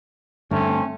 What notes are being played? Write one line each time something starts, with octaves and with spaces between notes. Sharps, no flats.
G2 D3 A3 C4 C#4